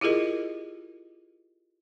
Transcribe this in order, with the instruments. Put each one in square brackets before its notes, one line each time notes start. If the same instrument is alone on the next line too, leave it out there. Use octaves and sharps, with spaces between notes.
[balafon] E4 F4 G4 G#4 A#4 D#5